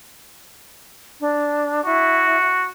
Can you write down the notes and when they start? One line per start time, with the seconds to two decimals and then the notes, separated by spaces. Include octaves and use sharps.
1.20 D4
1.85 E4 F#4